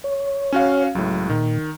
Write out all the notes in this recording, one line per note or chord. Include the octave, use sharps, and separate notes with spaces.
C#5
C#4 F#4 F5
C#2 A2 F#3
A#2 D#3